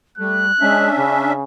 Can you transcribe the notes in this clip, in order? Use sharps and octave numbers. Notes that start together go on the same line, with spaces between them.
G3 A3 F#6
G#3 C#4 D4 E5
C#3